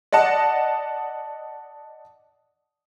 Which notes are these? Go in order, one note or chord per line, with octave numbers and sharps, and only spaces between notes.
D5 D#5 F#5 A5